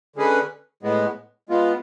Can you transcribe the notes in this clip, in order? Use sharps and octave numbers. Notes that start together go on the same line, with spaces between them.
D3 G#3 C#4 G#4 B4
A2 G#3 B3
G#3 B3 F4